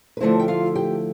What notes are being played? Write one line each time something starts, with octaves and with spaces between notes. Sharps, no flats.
B4
D3 F3 A3 C4 E4 C5
G5
F4 F5
G4 G5